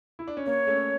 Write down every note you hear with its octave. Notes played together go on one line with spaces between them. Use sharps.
E4
D4
C#4
A#3 C#5
A3 C#4